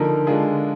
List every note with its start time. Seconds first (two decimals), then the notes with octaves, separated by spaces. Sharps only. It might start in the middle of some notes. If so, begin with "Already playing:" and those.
Already playing: D3 F3 A#3 D#4 A#4
0.27 D3 G#3 D4 F4 G#4